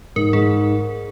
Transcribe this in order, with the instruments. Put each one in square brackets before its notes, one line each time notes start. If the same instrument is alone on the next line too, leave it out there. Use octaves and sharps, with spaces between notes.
[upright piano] G#2 [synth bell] A#4
[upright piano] G#2 [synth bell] G#4